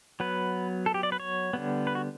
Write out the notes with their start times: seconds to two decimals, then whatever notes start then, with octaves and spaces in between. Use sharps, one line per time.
0.20 F#3 B3 B4
0.86 A4
0.94 G4
1.03 D5
1.12 B4
1.20 C#5
1.53 D3 G3 B3
1.87 B4
1.95 F#4